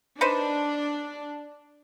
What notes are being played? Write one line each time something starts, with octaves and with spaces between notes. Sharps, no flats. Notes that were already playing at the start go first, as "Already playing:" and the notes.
D4 D#4 B4 C5